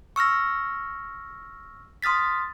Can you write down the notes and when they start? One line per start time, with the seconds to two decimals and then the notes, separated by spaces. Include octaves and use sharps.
0.16 C#6 E6 F6 A#6
2.02 C6 D#6 F6 A6 B6